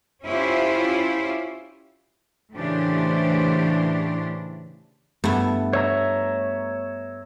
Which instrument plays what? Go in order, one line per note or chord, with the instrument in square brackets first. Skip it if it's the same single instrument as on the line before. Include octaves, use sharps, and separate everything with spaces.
[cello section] C#4 E4 F4 G4 C5
A2 C#3 E3 D4 G4 C5
[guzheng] G2 E4 [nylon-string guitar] A3 B3
[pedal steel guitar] C#5 E5 A#5